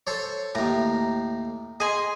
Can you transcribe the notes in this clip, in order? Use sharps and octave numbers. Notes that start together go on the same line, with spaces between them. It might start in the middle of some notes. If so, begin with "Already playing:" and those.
A4 C5 C#5
D#2 A2 A#5
G#4 D#5 G#5 C6